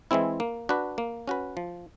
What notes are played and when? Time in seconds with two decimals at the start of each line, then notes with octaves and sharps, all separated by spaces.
0.11 E3 G#3 C4 E4
0.40 A#3
0.69 D4 F#4 B4
0.98 A#3
1.28 C#4 F#4 B4
1.57 F3